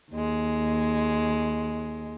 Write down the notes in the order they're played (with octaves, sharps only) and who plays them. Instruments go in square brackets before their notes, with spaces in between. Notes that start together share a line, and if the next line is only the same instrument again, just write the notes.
[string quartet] D#2 G#3